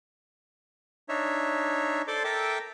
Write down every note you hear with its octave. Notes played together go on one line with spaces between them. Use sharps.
D4 D#4 C#5 E5
A4 C5 D5 C6 D6
A4 A#4 E5 G5 A5 D6